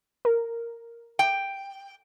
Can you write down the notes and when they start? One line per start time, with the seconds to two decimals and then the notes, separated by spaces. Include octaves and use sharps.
0.25 A#4
1.19 G5